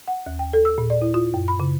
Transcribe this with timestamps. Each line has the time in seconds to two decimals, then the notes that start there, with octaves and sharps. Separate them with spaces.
0.08 F#5
0.26 D#2
0.39 G5
0.53 A4
0.65 E6
0.78 A#2
0.90 D5
1.02 E4
1.14 F4
1.34 F#2
1.48 B5
1.60 C#3